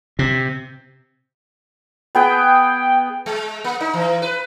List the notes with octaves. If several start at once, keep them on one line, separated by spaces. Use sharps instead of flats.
C3
B3 G#4 B4 G5
G#3
A#3
D#4
E3
B4